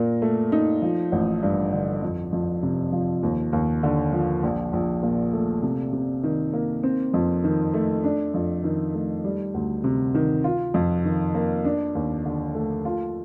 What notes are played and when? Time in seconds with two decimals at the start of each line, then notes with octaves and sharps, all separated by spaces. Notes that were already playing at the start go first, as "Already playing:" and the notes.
Already playing: A#2 A#4
0.22 A3
0.52 D#4
0.82 F3
1.12 A1
1.43 G2
1.73 D3
2.02 F2
2.32 F2
2.63 C3
2.92 F3
3.23 D#2
3.53 D#2
3.83 D3
4.13 F3
4.43 A#1
4.73 A#1
5.03 A#2
5.33 A3
5.63 C3
5.93 C3
6.23 D#3
6.53 A#3
6.83 C4
7.14 F2
7.44 D#3
7.74 A3
8.04 D4
8.34 F2
8.64 D#3
8.94 A3
9.24 G3
9.54 D2
9.84 C3
10.15 D#3
10.44 F4
10.74 F2
11.05 D#3
11.35 A#3
11.65 D4
11.95 D#2
12.25 D3
12.55 A3
12.85 F4